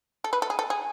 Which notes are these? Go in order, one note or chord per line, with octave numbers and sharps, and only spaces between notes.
A4
B4
A4
G#4
A4
G#4